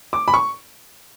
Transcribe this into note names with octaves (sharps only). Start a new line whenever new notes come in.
D6
B5
C#6